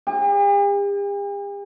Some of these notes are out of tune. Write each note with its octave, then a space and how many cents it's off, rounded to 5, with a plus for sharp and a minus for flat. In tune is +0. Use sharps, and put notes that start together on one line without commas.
G4 +45